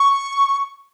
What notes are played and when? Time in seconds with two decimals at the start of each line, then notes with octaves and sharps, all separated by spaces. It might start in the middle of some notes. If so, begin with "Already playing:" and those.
Already playing: C#6